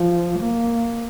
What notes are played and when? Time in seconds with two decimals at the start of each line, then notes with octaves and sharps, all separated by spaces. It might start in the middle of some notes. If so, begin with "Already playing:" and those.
Already playing: F3
0.40 A#3